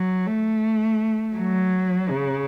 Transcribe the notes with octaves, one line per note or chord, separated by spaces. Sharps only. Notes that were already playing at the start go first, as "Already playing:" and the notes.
Already playing: F#3
A3
F#3
C#3